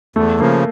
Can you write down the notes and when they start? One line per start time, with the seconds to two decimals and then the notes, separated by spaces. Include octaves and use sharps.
0.16 E2 A3
0.40 C#3 F3 A#3